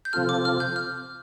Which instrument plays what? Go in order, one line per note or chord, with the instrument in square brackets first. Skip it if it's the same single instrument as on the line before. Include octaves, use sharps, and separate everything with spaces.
[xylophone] G6
[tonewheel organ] C3 F3 C4 F4 A4 [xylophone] F6
[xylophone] D6
F6
G6
F6